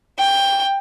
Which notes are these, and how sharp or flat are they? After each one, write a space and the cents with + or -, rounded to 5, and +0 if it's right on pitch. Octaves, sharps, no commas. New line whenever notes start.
G5 +15